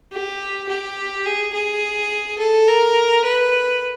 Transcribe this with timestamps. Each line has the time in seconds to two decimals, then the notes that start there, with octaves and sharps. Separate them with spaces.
0.12 G4
0.69 G4
1.26 G#4
1.53 G#4
2.39 A4
2.68 A#4
3.25 B4